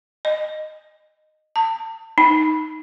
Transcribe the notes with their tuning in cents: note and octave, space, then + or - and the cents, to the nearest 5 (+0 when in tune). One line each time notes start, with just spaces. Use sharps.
D#5 -15
A5 +35
D#4 +5